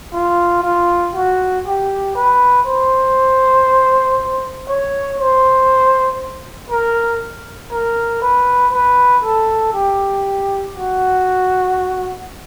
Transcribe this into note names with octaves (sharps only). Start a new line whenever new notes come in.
F4
F4
F#4
G4
B4
C5
C#5
C5
A#4
A#4
B4
B4
A4
G4
F#4